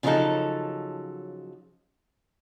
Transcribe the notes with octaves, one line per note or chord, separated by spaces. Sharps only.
C#3 F3 F#3 C4 D#4 A4